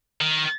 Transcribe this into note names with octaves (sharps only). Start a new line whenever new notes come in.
D#3